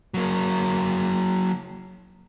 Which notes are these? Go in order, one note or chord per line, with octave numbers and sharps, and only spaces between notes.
F#3 A#3